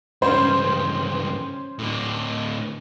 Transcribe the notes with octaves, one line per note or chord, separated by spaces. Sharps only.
C#2 G2 C#4 C5
A2 D3